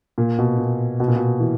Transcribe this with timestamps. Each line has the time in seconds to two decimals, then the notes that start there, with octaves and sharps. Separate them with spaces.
0.18 A#2
0.39 B2
0.58 A#2
1.00 B2
1.08 A#2
1.16 B2
1.40 E3